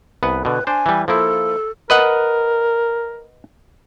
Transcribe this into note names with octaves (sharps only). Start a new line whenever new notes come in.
C2 B3 B4
B2 D3 B4
D4 C5 G#5
E3 G3
F3 A#3 E4 A4
A#4 B4 D#5 F#5